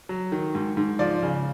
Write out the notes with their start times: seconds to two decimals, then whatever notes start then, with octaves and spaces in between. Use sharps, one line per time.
0.09 F#3
0.32 D#3
0.55 G#2
0.77 G#2
0.99 F3 D5
1.23 C#3